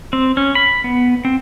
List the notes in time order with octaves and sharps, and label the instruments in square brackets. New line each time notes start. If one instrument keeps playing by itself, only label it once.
[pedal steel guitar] C4
C#4
B5
B3
C4